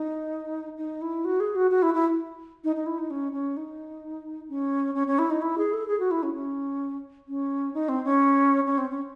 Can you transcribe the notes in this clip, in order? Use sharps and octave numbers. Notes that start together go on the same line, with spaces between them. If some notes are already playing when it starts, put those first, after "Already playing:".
Already playing: D#4
D#4
E4
F#4
G#4
F#4
F#4
E4
E4
D#4
D#4
E4
D#4
C#4
C#4
D#4
C#4
C#4
C#4
E4
D#4
E4
G#4
A4
G#4
F#4
E4
C#4
C#4
C#4
D#4
C4
C#4
C#4
C4
C#4